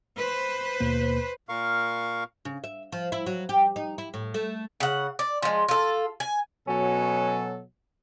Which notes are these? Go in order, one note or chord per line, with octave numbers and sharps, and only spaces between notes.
B4 C5
D#2 B2 A#3
A#2 A#4 F5 C#6
C#3
E5
F3
E4
F#3
G4
D#4
E4
A2
A3
C#3 F#5
D5
F3 G#3
F4 A4
G#5
B2 F#3 C#4 A4